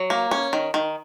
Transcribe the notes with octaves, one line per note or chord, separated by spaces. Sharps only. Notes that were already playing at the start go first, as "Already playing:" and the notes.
Already playing: F#3
A#3
C#4
D#3
D#3